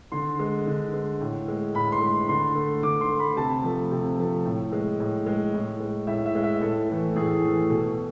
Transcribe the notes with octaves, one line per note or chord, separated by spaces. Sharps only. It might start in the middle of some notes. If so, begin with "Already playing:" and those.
D3 C6
G#3
D3
G#3
A2
G#3
A2 B5
C6
G#3
D3 C6
A3
D3 D6
C6
A3
B5
C3 A5
F3 A3
C3
F3 A3
A2
G#3
A2
G#3
A2
G#3
A2 E5
E5
G#3
E5
A2 A4
E3 A3
A2 G#4
E3 A3
B2 A4